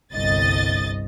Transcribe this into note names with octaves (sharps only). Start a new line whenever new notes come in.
G1 C2 D#5 A6